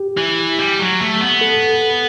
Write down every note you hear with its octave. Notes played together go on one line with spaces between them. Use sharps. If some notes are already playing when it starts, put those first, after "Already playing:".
Already playing: G4
E3
G3
F#3
A3
B3
A4